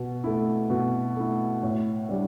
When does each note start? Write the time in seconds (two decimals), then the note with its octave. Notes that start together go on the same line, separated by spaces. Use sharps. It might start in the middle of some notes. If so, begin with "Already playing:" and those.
Already playing: B2
0.24 A3 E4
0.70 B2
1.16 A3 E4
1.63 A2
2.09 G3 D4